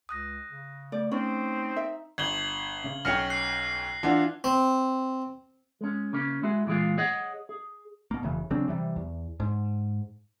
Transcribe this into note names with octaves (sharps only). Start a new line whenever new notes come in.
C#2 D#6 F#6 A#6
C#3
A3 D5
C4 C#4 D#4
E5
G1 G#6 F#7 G7
C#3
B1 C#4 G5 F6 A#6 C#7
F#6 C7
E3 D4 F4 F#5
C4
G#3 C#4
C#3 A#3 C#4
G#3 E4 F#4 G#4
A#2 E3 G#3 F4
G#4 C#5 D#5 F#5
G#4
B2 A#3
F1 C#3 E3
C#3 F#3 C4 D4
C3 E3 G3
E2
G#2